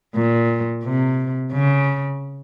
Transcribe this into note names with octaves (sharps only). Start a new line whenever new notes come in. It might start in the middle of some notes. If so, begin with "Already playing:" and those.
A#2
C3
C#3